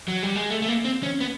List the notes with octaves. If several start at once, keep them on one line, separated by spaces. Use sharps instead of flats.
F#3
G3
G#3
A3
A3
A#3
C4
C#4
B3